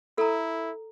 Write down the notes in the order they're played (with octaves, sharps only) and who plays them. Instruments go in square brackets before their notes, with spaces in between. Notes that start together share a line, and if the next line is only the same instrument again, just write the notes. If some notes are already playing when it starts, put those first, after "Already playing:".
[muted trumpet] E4 [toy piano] A4 A#5